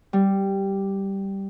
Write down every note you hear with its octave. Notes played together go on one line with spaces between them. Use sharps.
G3